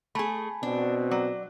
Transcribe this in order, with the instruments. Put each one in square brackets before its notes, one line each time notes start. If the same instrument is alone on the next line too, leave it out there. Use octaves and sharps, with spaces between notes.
[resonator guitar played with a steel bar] A3 G#4 [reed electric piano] G#5 A5 B5
[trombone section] B2 C4 F#4 [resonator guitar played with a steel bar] D4
[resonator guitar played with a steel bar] F#3 [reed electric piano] D5